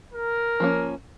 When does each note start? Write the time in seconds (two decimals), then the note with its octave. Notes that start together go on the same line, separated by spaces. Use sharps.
0.12 A#4
0.60 F3 A#3 C#4